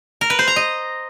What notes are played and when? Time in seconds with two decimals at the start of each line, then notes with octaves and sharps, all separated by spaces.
0.21 A#4
0.30 B4
0.39 C5
0.48 A#5
0.56 D#5